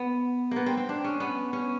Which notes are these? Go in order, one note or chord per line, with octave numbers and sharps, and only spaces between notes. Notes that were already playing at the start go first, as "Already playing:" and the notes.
Already playing: B3
A#3 B3
C4
C4
D4
C#4
B3
C#4